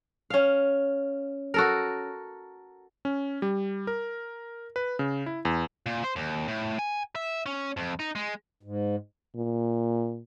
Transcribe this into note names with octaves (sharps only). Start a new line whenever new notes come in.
C#4 F5
F#4 A4 A#4
C#4
G3
A#4
B4
C#3
E4
E2
A#2
C5
D#2
A2
G#5
E5
C#4
F2
D#4
G#3
G#2
A#2